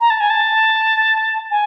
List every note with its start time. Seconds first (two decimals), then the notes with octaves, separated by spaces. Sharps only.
0.01 A#5
0.10 A5
0.20 G#5
0.30 A5
1.51 G#5